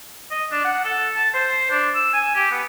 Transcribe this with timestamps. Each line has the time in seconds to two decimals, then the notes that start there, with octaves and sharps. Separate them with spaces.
0.30 D#5
0.51 D4
0.64 F#5
0.84 A4
1.16 A5
1.34 C5
1.71 D4
1.95 E6
2.13 G#5
2.35 G4
2.50 B3